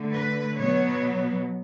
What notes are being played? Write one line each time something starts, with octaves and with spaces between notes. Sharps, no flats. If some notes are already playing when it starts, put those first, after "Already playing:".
Already playing: D3 A3
B4
B2 F#3 B3 C#5